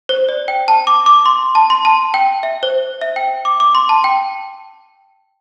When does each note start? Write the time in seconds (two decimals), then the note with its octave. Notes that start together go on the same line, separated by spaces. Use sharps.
0.09 C5
0.29 D5
0.48 G5
0.68 A5
0.87 D6
1.06 D6
1.26 C6
1.55 A5
1.70 C6
1.85 A5
2.14 G5
2.43 E5
2.63 C5
3.01 E5
3.16 G5
3.45 D6
3.60 D6
3.75 C6
3.89 A5
4.04 G5